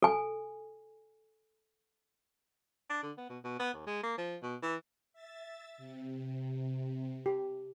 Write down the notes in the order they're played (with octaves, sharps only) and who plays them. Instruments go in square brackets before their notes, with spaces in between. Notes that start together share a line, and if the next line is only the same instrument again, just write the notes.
[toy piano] A4 G#5
[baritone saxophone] D4
D3
B3
B2
B2
B3
D#2
G#3
A#3
F3
B2
E3
[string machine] E5 A6
C3
[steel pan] G4